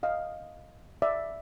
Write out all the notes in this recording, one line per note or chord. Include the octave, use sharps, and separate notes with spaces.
D#5 F5
D5 E5